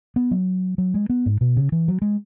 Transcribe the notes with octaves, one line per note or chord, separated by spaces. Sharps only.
B3
F#3
F#3
G#3
B3
G#2
B2
C#3
E3
F#3
G#3